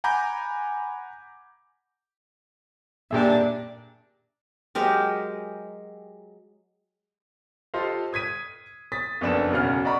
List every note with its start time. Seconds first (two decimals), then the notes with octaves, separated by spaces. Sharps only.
0.04 F#5 G#5 A#5 B5 D6 G6
3.11 A#2 D4 G4 G#4 E5
4.75 F#3 G#3 G4 A#4
7.74 F4 G4 A4 C5 D#5 F5
8.13 D#6 G#6 B6 D#7
8.92 D#6 A6 B6
9.21 F#1 F2 B3 D4 A4 E7
9.51 E1 B1 C#3 F#5 F6
9.85 D5 D#5 F#5 A#5 B5 C#6